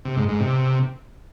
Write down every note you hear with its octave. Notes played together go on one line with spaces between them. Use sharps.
C3
G#2
G#2
C3